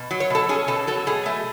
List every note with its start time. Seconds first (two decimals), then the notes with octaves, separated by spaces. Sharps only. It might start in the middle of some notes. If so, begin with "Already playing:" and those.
Already playing: B2
0.11 F#3
0.20 C#5
0.30 B2 A4
0.49 C#4 G#4
0.68 B2 A4
0.87 F#3 A4
1.07 B2 G#4
1.26 A3